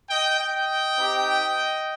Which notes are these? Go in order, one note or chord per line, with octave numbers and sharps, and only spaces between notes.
D#5 G5
D#5 G5
C4 D#4 G4